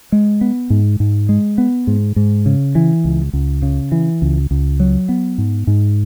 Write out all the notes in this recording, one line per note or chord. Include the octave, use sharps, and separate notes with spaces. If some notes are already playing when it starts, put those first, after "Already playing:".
G#3
B3
G#2
G#2
G#3
B3
G#2
G#2
C#3
E3
C#2
C#2
C#3
E3
C#2
C#2
F#3
B3
G#2
G#2